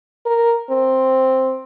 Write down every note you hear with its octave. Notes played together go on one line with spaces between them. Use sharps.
A#4
C4